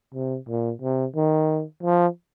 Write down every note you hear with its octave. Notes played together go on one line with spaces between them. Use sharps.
C3
A#2
C3
D#3
F3